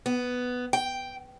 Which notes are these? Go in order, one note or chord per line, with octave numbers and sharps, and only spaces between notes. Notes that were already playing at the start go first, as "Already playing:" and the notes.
B3
G5